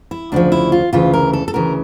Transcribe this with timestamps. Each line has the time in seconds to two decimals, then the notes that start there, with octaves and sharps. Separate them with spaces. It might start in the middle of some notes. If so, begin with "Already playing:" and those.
0.11 E4
0.32 D2 C#3 F3 D4
0.52 E4
0.72 F4
0.93 D2 C#3 E3 F4
1.13 A#4
1.33 A4
1.48 A4
1.53 D2 C#3 E3 A#4